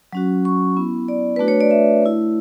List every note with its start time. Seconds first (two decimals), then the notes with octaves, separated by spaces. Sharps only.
0.13 F#3 C#4 F#4
0.45 C#6
0.77 B3 E4
1.08 D5
1.36 A3 D4 F#4 B4
1.48 C#5
1.60 D5
1.71 E5
2.03 A3 E4